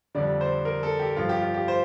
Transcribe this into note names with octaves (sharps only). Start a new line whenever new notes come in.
F2 D3 G3 D5
C5
A#4
A4
G4
G2 F3 F4
G4
F4
G4
C5